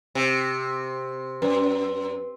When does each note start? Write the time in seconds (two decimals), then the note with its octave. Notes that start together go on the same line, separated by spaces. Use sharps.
0.15 C3
1.42 F#2 B4